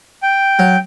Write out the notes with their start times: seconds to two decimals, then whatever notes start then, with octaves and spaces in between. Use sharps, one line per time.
0.22 G5
0.59 F#3